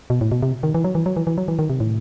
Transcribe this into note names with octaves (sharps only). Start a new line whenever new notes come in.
B2
A2
B2
C3
D#3
E3
F#3
E3
F#3
E3
E3
F#3
E3
D#3
C3
A2